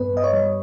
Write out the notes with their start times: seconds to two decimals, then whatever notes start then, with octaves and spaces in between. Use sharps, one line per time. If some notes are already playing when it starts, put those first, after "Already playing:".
Already playing: G2 B3 B4
0.13 G2 D#5
0.24 C#5
0.33 G3